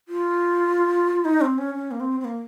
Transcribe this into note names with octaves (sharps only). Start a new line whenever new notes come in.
F4
D#4
C4
C#4
C#4
A#3
C4
C4
A#3